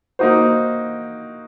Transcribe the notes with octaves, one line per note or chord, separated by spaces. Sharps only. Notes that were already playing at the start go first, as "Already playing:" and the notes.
A#3 D#4 F#4 C5